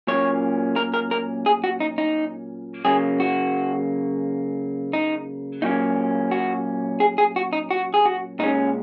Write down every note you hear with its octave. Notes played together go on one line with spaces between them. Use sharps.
A#2 F#3 A#3 C#4 C#5
A#4
A#4
A#4
G#4
F#4
D#4
D#4
C#3 F#3 A#3 G#4
F#4
D#4
A#2 F#3 A#3 C#4 D#4
F#4
G#4
G#4
F#4
D#4
F#4
G#4
F#4
A#2 G#3 C#4 D#4